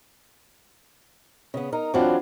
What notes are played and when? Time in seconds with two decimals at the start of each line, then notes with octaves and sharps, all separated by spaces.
1.54 C#3 B3
1.72 D#4 A#4
1.94 E3 F#3 C4 D4 F4 F#4